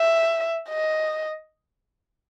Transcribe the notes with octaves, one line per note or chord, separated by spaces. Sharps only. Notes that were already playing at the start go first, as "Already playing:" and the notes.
Already playing: E5
D#5